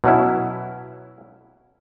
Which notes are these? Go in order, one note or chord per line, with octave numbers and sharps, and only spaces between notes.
B2 F#3 C#4 E4